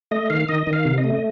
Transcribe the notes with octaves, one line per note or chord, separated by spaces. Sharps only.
A3 D#5
D#3 F5
D#3 D#5
D#3
F5
C3
D#5
A3
D#5